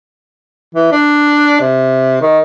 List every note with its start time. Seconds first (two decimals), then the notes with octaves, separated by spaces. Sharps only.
0.75 E3
0.92 D4
1.61 C3
2.21 D#3